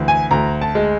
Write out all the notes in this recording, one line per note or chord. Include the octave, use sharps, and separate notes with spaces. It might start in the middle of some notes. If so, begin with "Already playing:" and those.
Already playing: D2 E3
G#5
D2 A#5
A5
G#3